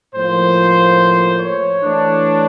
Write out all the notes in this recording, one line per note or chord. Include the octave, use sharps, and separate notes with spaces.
A2 F3 A#3 C5
C#5
E3 A3 D4